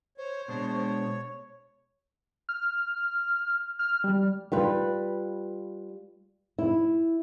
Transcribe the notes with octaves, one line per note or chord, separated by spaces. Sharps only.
C5 C#5
B2 G#3 D4 C#5
F6
F6
G3
G3 F4 B4
E4